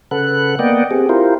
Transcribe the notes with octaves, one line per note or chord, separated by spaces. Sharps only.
C#3 A4 B4 F#5 F#6
A#3 B3 D5 D#5 F#5 G5
C4 G4 G#4
E4 F4 G4 A#4 C5